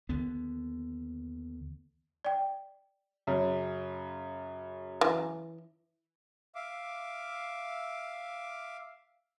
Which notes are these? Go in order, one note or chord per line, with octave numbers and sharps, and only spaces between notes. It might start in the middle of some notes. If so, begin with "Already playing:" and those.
D#2 D3 B3
D5 G5
F#2 C#3
E3
E5 F5 D6